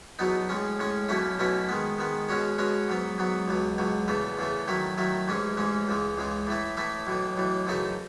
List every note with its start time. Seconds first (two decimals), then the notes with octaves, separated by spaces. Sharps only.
0.19 E2 B2 F#3 B3 D#4
0.49 A2 G#3 C#4
0.79 A2 G#3 C#4
1.09 B1 B2 A3 C#4 E4
1.39 B1 B2 A3 C#4 E4
1.69 D#3 G#3 B3
1.98 D#3 G#3 B3
2.29 B2 G#3 C#4 F#4 C#5
2.58 B2 G#3 C#4 F#4 C#5
2.88 G#2 F#3 B3
3.18 G#2 F#3 B3
3.48 C#2 B2 F#3
3.78 C#2 B2 F#3
4.08 E2 C#3 E3 A3
4.38 E2 C#3 E3 A3
4.68 D#3 F#3 A3 E4
4.98 D#3 F#3 A3 E4
5.28 A1 G#2 E3 G#3 C#4
5.57 A1 G#2 E3 G#3 C#4
5.87 C#2 C#3 E3 G#3
6.17 C#2 C#3 E3 G#3
6.47 A2 E3 A3 E4
6.77 A2 E3 A3 E4
7.07 B1 A2 E3
7.37 B1 A2 E3
7.67 F#2 C#3 E3 A3 D#4